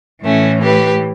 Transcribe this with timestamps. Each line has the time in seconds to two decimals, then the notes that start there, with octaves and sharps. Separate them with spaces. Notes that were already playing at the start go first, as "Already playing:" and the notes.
0.24 A2 E3 A3 C#4
0.63 G4 B4